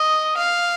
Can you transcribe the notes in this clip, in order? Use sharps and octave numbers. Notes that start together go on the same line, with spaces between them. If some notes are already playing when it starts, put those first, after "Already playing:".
Already playing: D#5
F5